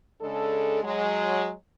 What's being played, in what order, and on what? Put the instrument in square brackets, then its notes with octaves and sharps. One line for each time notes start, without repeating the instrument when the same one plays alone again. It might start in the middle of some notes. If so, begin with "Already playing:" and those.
[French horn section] C#3 G#3 D4 A4
F#3 G#3